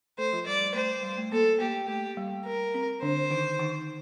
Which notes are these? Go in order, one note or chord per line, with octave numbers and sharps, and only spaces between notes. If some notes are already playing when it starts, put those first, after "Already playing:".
A3 A4 C5
F3 F4
G3 D5
G3
A3 C5
G3
A3
A#3 A4
A#3 G4
A3 G4
G3
A#4
C4
D3 D4 C5
D#3 D#4
D#3 D#4